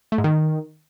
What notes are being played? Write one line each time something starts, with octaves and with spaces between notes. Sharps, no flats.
A3
G#2
D#3